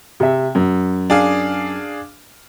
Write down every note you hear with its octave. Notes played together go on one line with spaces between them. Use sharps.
C3 E5
F#2
D4 G#4 F5